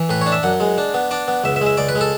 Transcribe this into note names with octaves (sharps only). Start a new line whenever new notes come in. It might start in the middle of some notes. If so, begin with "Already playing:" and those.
Already playing: E3
A2 B4
C#5
D4
E5
F#2 F#5
G#3
D4
B3
D4 D5
B3
C#2 E5
E5
G#3
E5
C#2 D5
B4
G#3
A4